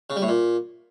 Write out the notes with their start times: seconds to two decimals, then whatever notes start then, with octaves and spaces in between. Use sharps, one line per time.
0.10 C#3
0.16 G3
0.22 A2
0.28 A#2